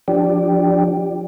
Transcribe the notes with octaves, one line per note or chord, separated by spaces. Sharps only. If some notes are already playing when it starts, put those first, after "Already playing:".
F3 D4 G4